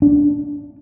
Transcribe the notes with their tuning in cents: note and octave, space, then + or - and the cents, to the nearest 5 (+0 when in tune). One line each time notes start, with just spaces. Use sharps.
D4 -10